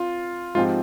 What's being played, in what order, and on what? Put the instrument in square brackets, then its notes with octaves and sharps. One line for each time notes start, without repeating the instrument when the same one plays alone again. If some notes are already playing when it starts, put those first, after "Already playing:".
Already playing: [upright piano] C4 [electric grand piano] F4
[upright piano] G#2 F3 G#3 C4 G4 [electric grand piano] F4